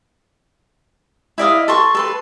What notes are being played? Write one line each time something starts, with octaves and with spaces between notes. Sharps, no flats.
E4 D5 D#5 F5
A4 C6 C#6
A4 B4 C6